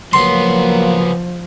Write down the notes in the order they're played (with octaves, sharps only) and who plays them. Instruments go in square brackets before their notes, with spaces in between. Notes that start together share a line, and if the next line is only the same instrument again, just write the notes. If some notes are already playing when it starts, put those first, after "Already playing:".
[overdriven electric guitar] C#2 B3 [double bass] F3 [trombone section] F#3 A#3 [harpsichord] C6